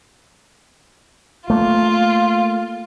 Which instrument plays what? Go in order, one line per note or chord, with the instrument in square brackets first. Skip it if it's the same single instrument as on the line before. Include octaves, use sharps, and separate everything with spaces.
[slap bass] A3 A#3 [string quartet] F4